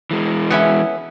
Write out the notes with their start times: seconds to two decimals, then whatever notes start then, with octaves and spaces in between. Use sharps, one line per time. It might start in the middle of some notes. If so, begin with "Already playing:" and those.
0.11 E3 G#3
0.50 B3 C#4 E4